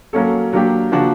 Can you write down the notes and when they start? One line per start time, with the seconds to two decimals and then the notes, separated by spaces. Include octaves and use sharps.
0.13 F#3 A#3 C#4 F#4 A4
0.52 A#2 F#3 A#3 D4 G4
0.92 C#3 F3 A#3 D4 F#4